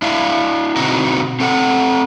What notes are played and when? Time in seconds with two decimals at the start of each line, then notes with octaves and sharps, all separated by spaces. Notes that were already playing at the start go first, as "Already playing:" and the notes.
0.02 D4 E4 F5
0.76 B2 D3 C4 D#4 F#4 A#5
1.40 C4 A4 F#5